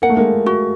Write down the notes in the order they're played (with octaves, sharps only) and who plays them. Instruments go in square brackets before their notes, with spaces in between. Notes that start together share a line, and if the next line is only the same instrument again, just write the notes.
[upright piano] A#3 [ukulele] F#5
[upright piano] A3
G#3 A#3
[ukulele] F#4